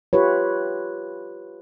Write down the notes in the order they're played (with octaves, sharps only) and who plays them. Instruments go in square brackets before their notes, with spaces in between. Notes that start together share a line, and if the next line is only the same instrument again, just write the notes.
[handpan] F4 G4 B4 C#5